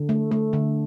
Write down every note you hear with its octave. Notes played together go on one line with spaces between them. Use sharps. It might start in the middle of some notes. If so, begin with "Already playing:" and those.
Already playing: D3
A3
A3
D3